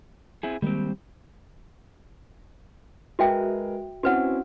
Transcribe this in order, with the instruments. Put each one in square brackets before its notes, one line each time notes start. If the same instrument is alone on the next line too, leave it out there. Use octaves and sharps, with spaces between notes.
[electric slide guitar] C4 E4 G#4
[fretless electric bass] D#3 G#3 A#3 [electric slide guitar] G3 C4
[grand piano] G#3 A#4 B4 [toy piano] F#4 E5 G5
[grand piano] C4 C#4 E4 [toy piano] F#4 B4 F#5